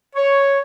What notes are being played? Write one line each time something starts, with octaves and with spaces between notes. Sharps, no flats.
C#5